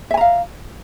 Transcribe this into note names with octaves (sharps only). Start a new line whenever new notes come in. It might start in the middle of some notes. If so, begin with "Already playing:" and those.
E5 F5 G#5 A#5